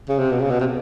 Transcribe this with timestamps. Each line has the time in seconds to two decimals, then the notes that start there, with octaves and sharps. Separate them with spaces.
0.09 C#3
0.19 C3
0.32 B2
0.41 C#3
0.51 B2
0.60 C3